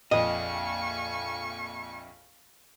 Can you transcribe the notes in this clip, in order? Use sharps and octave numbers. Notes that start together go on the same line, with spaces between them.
A#1 F2 D#5 F5 G#5 C#6